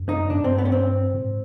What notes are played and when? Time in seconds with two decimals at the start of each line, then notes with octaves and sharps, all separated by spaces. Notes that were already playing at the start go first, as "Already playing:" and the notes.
Already playing: F#2
0.09 D#4
0.30 G2 D4
0.44 C4
0.58 B3
0.65 C#4
0.72 C4
1.14 G#2